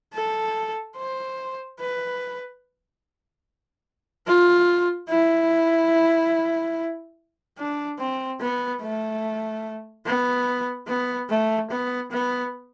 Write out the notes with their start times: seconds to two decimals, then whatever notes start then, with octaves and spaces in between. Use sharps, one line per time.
0.14 A4
0.97 C5
1.80 B4
4.27 F4
5.09 E4
7.58 D4
7.99 C4
8.41 B3
8.82 A3
10.06 B3
10.88 B3
11.30 A3
11.71 B3
12.12 B3